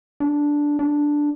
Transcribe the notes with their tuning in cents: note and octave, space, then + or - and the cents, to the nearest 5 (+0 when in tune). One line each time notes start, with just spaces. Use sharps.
D4 -5
D4 +0